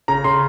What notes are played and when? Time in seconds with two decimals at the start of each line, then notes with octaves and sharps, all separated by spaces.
0.08 C#3 A#5
0.24 C#3 C6